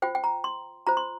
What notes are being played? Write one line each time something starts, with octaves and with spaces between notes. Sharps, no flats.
F4 C5 G5
G5
A#5
C6
F4 C5 A#5
C6